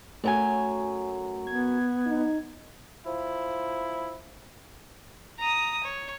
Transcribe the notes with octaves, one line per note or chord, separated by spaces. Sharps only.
F#2 F#3 A3 G#5
B3 G#6
D#4
F3 E4
A#5 D#6
C#5